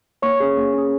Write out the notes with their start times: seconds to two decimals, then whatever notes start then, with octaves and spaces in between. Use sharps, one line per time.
0.22 A#3 C#5 C#6
0.40 C#4 G#4
0.57 A#3
0.74 C#4 G#4